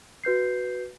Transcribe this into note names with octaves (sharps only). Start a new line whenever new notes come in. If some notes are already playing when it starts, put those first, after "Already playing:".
F#4 B4 G6 C7